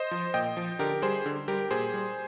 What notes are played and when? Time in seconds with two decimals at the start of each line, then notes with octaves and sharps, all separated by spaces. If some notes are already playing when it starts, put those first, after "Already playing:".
Already playing: C5 D#5
0.11 F3
0.34 A#2 D#5 G5
0.57 F3
0.79 D3 G4 A#4
1.02 G3 G#4 C5
1.26 D3
1.48 G3 G4 A#4
1.71 A#2 G#4 C5
1.94 G3